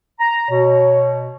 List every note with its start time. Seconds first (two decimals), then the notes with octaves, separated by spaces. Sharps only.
0.20 A#5
0.50 B2 C#5